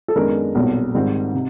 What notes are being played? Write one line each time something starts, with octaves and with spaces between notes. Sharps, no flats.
A4
F#2 D#3 G#3 B3 D4 A#4
B1 A#2 G3 C4
G#2 D#3 G3 C4
C3